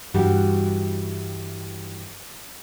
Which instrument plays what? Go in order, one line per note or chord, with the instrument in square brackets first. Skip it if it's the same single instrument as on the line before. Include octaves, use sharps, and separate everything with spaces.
[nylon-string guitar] G2 E3 G3 F#4 G4